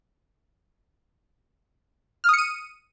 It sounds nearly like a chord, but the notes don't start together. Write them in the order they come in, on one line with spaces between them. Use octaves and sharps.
F6 D#6 C#7 D#7